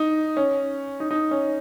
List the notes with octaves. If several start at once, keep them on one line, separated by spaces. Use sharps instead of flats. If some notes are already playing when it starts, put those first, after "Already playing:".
Already playing: D#4
C#4
D#4
D#4
C#4